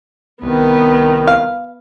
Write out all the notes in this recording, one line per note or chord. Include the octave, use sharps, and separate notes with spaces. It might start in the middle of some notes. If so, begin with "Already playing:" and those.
C2 D#3 B3 B4
F5